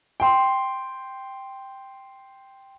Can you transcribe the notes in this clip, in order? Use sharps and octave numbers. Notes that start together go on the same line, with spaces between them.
G5 C6